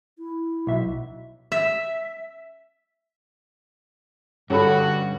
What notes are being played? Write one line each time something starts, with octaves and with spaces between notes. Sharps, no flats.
E4
B1 E5
E5
G2 D3 C#4 F#4 A4 B5